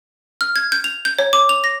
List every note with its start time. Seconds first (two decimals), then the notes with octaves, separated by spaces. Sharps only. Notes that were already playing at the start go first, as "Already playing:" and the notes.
0.41 F6
0.56 G#6
0.72 G6
0.84 F7
1.05 G6
1.19 C#5
1.33 D6
1.49 F7
1.64 A#6